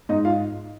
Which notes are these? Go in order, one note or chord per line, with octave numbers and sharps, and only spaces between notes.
G#2 D#4 D#5
F4 F5